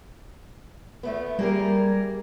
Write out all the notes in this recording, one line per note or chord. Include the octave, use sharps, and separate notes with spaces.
E2 A3 B3
G3 A#3 G#4 A#4